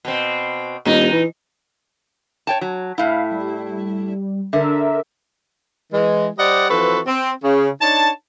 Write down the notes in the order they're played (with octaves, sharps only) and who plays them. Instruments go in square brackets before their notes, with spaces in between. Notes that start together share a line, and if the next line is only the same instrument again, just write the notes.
[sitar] B2 C4
[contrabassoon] E1 [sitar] A#2 D#4
[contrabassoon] E3
[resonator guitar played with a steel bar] C#5 G5 A5
F#3
[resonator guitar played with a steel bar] A2 E4 [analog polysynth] F5
[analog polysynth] G3
[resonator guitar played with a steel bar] D3 [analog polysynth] A#4 E5
[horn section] E3 G#3
G3 C5 D5 D#5 F#5
E3 F3 C4 F#4 A4 B4
C4
C#3
D4 D#4 C#5 A5